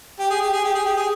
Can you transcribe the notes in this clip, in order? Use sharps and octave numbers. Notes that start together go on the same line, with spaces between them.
G4
G#4
G4
G#4
G4
G#4
G4
G#4